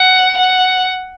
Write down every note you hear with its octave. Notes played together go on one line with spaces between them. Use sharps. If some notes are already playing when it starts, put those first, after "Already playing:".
Already playing: F#5
F#5